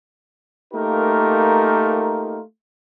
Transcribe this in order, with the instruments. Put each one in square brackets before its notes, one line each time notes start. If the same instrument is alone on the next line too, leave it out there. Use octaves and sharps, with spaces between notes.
[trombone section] A3 A#3 D#4 F4 G4 A#4